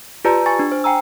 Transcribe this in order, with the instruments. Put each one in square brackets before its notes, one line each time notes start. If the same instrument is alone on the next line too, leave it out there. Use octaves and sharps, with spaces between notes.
[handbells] F4 G4 B4 D5 A5 A#5
G#5 C#6 A6
D4
C5
G5 G#5 A#5 E6